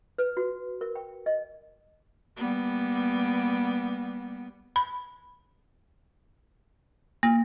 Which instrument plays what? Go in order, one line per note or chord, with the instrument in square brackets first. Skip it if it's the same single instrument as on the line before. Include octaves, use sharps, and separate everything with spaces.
[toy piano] B4
F#4
A#4
G5
D#5
[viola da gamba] G3 A#3 B3
[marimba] B5
A#3